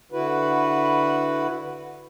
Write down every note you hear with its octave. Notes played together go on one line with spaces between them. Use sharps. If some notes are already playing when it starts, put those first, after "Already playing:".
D3 E4 F#4 B4